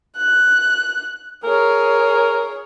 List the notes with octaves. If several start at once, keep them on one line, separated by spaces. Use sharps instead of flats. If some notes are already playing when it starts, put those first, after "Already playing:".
F#6
G#4 A#4 C#5